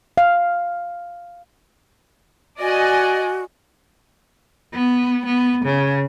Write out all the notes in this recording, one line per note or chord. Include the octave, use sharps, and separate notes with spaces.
F5
F#4 D5 D#5 G#5
B3
B3
C#3